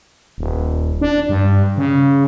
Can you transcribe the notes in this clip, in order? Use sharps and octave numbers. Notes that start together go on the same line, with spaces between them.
D#1
D4
G2
C#3